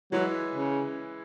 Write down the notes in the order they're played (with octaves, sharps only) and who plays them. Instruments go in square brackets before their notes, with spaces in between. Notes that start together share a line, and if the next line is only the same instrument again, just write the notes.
[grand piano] E3 G#3 E4 B4 [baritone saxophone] F#3
[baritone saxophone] C#3